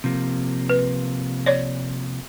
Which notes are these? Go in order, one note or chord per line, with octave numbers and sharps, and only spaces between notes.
C3 F3 A#3
B4
C#5 D5